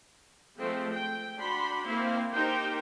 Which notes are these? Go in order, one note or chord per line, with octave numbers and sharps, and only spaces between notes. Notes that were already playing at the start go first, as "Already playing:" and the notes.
F3 G#3 A3 C4
G5
D4 F#4 B5 C6
A#3 C4 E4 F5
D#4 G4 A#4 C5 G5